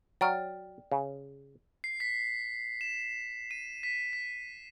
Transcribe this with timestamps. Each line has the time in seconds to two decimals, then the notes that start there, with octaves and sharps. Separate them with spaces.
0.21 F#3 D5 G5 F6
0.92 C#3
1.84 C7
2.00 B6
2.81 E7
3.51 D#7
3.83 B6
4.13 B6